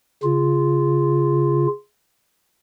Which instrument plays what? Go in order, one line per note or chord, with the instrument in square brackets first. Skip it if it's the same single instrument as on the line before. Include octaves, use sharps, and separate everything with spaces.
[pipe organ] C#3 F4